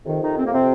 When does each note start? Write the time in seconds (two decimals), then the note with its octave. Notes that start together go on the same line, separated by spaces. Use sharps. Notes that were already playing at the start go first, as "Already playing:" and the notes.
0.04 F2 C3 D#3
0.21 D#3 D#4
0.38 C4
0.45 A#3
0.52 C3 C4